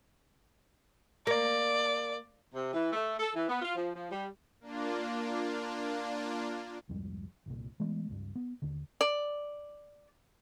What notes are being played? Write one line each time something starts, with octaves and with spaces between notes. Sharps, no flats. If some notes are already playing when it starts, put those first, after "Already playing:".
A#3 D5
C3
E3
A3
A4
E3
B3
F4
F3
F3
G3
A#3 D4 F4
C2 F2 G#2 G3
G1 C2 A#2
E3 G#3 A3 B3
C#2 G2
B3
D#2 D3
D5